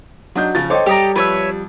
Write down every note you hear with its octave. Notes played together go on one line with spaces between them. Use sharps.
F#3 D4 D#4 F#4 G6
C#3 F3 A6
A4 C5 C#5 D#5 G5 D6
G3 G4 D#5 A#5
F2 B4 C#5 E5